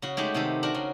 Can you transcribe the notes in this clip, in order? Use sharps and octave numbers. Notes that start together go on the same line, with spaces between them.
C#3 F#4
G#3 A3 D#4 F#4 G4
C3 D#3 A4
D4 F#4 A#4
C#3